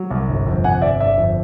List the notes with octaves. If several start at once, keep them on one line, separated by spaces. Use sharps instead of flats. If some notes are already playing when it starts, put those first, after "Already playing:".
Already playing: F#3
C2
G1
F2
C3 F#5 G#5
G1 D5 E5
G1 D5 E5
F2